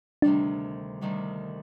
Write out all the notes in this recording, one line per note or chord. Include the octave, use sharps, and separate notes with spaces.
D2 C3 D#3 G3 D4
D2 C3 D#3 G3